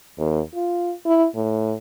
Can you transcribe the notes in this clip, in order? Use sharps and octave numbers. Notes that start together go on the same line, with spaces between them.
D#2
F4
E4
A2